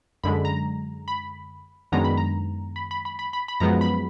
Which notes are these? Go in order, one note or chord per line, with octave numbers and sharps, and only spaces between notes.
F#2 D3 G#3 B5
A#5
B5
F#2 D#3 G#3 B3 D4 A#5
B5
A#5
B5
B5
B5
B5
B5
B5
F#2 F3 G#3 B3 A#5
B5